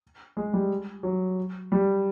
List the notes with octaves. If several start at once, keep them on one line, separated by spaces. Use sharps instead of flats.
G#3
G3
F#3
G3